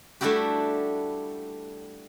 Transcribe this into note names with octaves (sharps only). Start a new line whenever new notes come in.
G3 A3 D4 E4 F#4 G4